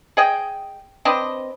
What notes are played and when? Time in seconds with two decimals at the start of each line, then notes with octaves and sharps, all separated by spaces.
0.17 G#4 D#5 G5
1.05 C4 D4 B4 D#5